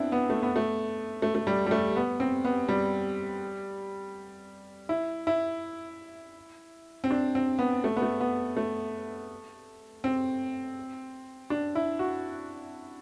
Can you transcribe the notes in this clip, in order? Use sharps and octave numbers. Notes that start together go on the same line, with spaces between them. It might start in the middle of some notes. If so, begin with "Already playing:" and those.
Already playing: B3 C4 D4 E4
B3
A3
B3
A3
A3
A3
G3
G3
A3
B3
C4
B3
G3
E4
E4
C4
D4
C4
B3
A3
B3
A3
B3
A3
C4
D4
E4
F#4